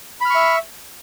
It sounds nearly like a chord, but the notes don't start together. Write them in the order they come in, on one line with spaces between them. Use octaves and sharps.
B5 F6 C#6 E5